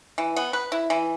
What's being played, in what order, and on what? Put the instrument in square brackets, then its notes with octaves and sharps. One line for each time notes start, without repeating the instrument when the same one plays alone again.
[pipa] E3
B3
B4
E4
E3